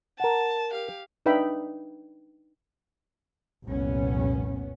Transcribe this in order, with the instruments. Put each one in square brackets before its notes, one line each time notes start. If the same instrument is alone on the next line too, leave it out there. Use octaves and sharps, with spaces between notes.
[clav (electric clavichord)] A#4 F#5 [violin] A5
[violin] G4 F5
[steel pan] D4 D#4 B4 E5 G5 B5
[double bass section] F1 C2 A#2 B3 C#4